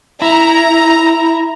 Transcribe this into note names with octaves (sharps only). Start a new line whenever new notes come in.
E4 A#5